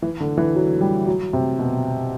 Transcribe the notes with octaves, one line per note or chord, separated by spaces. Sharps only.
E3
D3
E3
F#3
G3
F#3
C3
B2